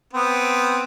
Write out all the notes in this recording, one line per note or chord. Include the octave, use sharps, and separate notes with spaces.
B3 C4